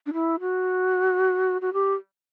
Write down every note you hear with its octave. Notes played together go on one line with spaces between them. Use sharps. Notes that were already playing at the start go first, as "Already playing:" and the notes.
D4
E4
F#4
F#4
G4